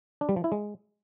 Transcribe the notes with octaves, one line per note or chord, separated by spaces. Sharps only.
D4
G3
F3
E4
G#3